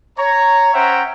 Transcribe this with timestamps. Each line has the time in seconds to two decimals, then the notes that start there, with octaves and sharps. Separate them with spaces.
0.17 C#5 A#5
0.74 C#4 C5 E5 F#5 G5 A#5